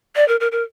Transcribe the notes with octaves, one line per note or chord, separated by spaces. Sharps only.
D5
A#4
A#4
A#4